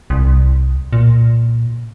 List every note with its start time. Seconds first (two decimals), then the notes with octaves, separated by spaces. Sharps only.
0.10 C2
0.93 A#2